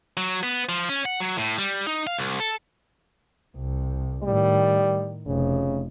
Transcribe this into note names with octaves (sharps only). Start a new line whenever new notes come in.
F#3
B3
F3
C#4
F#5
F#3
A2
G3
D#4
F5
C2
A4
C2
A2 D#3 G3
F1 C#3